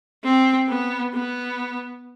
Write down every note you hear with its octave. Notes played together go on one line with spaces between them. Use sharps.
C4
B3
B3